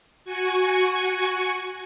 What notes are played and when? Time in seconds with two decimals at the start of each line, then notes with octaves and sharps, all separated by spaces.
0.25 F#4 G#5 C#6